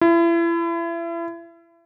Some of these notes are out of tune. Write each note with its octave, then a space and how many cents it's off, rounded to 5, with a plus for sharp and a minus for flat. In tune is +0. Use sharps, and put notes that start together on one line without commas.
E4 +35